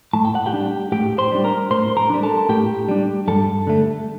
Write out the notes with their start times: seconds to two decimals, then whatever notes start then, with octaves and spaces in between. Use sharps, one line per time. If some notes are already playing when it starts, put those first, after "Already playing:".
0.13 A2 A5
0.25 G5
0.35 F#5
0.46 G4 G5
0.53 G3 D4
0.92 A2 G4 G5
1.18 C5 C6
1.31 G3 D4
1.44 A#4 A#5
1.71 A2 C5 C6
1.97 A#4 A#5
2.10 G3 D4
2.23 A4 A5
2.49 A2 G4 G5
2.88 G3 D4
3.28 G2 A4 A5
3.67 D3 A3